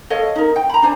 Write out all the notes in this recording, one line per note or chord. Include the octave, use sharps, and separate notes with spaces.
A4 C#5 D#5 F5
D#4 A#4
G5
A#5 B5
D4 C5 G#5